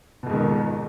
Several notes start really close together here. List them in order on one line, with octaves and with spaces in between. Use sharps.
B2 F2 G#2 D#3